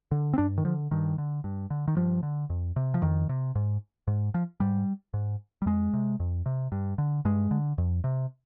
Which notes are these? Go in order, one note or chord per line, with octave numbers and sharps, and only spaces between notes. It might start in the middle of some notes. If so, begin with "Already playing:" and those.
D3
C4
G2 D4
D#3
D3 F3
G2 D#3
D3
G2
D3
D#3
G2 F3
D3
F2
C3
F3
F2 D#3
C3
G#2
G#2
F3
G#2 G3
G#2
G3
F2 G#3
C3
F2
C3
G2
D3
G2 G#3
D3
F2
C3